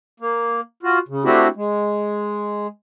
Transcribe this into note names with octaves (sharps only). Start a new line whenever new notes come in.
A#3
F4 F#4
C#3
A3 C4 D4 E4 F#4 G4
G#3